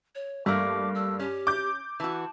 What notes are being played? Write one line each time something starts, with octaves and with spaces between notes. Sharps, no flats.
C#5
G2 A3 A#3 D6
E6
C#4 G4
D6 G6
E3 F#4 A5